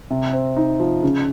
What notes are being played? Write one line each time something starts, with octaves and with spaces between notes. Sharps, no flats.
C3
C4
D#4
F3
C#3